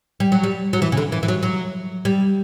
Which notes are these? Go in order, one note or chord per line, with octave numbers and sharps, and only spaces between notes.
G3
F#3
G3
F#3
E3
C#3
D3
E3
E3
F#3
F#3
G3